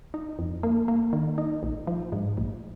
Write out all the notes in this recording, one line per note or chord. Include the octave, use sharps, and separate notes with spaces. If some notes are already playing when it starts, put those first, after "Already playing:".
D#4
F2
A#3
A#3
D#3
D#4
A#1
F3
G#2
A#1